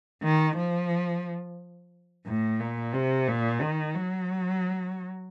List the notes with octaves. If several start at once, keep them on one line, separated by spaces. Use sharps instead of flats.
D#3
F3
A2
A#2
C3
A#2
D#3
F#3